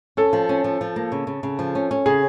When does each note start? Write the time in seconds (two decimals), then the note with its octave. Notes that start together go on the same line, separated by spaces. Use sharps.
0.17 C#4 A4
0.33 F3
0.49 C#4
0.64 F3
0.81 F3
0.96 A#3
1.12 C#3
1.27 C#3
1.43 C#3
1.59 F3
1.75 C#4
1.91 C#4
2.06 C#3 G#4